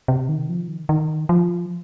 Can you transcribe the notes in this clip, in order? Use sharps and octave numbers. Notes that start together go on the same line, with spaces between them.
C3
D#3
F3
D#3
D#3
F3